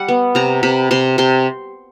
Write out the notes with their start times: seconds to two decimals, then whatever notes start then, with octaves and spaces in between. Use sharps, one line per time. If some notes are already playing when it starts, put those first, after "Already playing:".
Already playing: G3 F#5
0.08 B3
0.35 C3 A#5
0.63 C3 B5
0.91 C3 C6
1.18 C3 C6